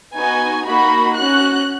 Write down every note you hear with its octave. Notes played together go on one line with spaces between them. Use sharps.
B3 D#4 F#4 G#5
A#3 D#4 F#4 B5
C#4 F#4 F#6